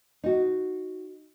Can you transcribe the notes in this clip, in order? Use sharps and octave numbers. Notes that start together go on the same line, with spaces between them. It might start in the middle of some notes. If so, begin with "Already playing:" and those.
D#4 F#4